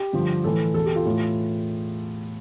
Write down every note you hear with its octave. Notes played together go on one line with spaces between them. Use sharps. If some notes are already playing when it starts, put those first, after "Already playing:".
Already playing: G4
G2 D3 F3
A2 E3 A4
E2 B2 A4
G4
F4
A2 E3